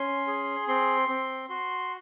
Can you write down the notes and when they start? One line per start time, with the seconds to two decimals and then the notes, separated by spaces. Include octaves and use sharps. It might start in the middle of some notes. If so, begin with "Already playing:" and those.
Already playing: C#4 C6
0.27 G#4
0.68 C4 C6
1.08 C4
1.49 F#4 C6